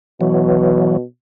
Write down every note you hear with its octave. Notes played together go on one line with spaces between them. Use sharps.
B2 E3 F#3